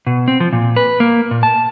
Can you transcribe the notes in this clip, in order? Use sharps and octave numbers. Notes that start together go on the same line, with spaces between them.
B2
C4
F3
A#2
B4
A#3
A#2
A5